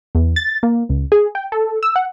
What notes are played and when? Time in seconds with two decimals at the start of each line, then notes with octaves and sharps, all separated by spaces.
0.15 E2
0.36 A6
0.63 A#3
0.89 C#2
1.12 G#4
1.35 G5
1.52 A4
1.83 E6
1.96 F#5